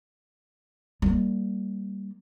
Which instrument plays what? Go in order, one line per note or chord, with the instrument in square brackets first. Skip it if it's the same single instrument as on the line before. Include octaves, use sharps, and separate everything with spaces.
[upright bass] G3 A#3